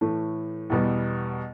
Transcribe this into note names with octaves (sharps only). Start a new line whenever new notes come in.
A2 E3 A3
E2 B2 G3 B3